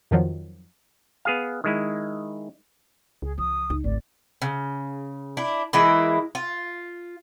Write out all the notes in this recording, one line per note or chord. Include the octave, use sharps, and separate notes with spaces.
F2 D#3 F3 F#3
B3 G#4 F5
D#3 G#3 E4
C#2 G#4
F3 D#6
C#2 D#4
G#1 A3 D5
C#3
D4 E4
E3 G#3 A#3 E4
F4